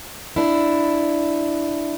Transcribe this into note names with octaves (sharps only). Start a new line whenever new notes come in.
D4 E4